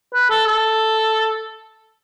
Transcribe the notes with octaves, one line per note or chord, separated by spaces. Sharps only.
B4
A4
A4